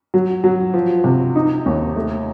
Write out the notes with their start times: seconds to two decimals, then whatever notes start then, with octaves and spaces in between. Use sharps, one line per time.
0.14 F#3
0.44 F#3
0.74 F3
1.04 C3
1.36 D#4
1.66 D#2
1.96 A3